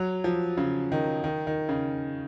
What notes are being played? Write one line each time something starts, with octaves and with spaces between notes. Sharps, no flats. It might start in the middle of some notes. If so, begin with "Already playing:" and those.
Already playing: F#3
F3
C#3
D#3
D#3
D#3
C#3